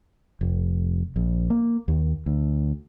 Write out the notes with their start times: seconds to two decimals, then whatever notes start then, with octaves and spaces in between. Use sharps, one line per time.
0.41 F1
1.16 A#1
1.50 A#3
1.88 D#2
2.26 D2